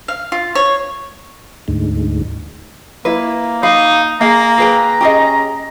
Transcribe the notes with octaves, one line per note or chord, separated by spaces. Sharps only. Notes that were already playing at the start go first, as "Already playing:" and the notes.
F5
F4
C#5
D2 G#2
A#3 E4 B4
D#4 F5 B5
A#3 G#4 F5 A#5
G#4 B4 G5
C#4 G4 G#4 D#5